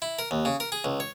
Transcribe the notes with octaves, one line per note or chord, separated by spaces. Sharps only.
E4
A#4
D#2
C#3
A#4
G#4
C#2
C#5